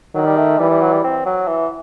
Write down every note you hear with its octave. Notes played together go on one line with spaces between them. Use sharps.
D#3 F#3
G3
A3
E3 G3
G3
F#3
G3
C4
F#3
E3